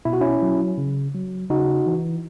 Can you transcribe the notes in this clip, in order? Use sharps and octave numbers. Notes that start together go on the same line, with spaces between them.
B2 E4
F#4
C#4 E4
F#3
C#3
F#3
C#3 D#4 F#4
E3